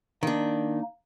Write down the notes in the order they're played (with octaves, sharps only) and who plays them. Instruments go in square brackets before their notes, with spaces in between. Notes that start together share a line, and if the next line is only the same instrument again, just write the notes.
[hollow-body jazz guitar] D#3 D4 [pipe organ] A#3 D#4